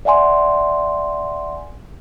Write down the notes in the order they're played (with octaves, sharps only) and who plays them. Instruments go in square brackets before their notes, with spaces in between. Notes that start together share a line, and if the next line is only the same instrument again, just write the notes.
[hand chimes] D5 E5 F#5 G#5 C6